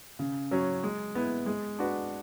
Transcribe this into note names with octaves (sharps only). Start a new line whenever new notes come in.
C#3
F#3 C#4
G#3
B3 E4
G#3
D4 F#4 B4